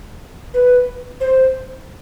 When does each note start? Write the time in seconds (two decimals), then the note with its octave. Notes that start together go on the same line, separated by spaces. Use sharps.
0.54 B4
1.21 C5